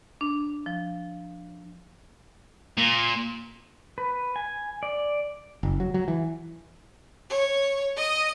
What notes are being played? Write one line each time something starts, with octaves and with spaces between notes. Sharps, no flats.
D4
F3
A#2
B4
G#5
D5
F#1
F#3
F#3
E3
C#5
D#5 D#6